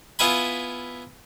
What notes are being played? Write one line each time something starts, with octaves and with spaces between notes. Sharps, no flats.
B3 E4 F4 E5 G#5 B5